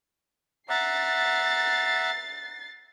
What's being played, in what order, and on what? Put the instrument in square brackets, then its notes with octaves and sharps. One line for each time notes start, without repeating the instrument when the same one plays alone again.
[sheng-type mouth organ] E5 F#5 A#5 [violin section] A6 C7